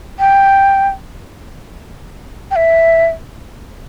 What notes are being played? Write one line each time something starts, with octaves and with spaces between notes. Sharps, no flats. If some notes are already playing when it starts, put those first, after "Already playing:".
G5
G5
E5